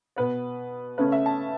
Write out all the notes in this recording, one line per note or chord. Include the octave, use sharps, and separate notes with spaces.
B2 B3 B4
C#3 A3 C#4 B4
E5
A5